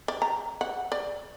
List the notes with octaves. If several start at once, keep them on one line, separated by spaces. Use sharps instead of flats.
D5
A#5
F#5
D5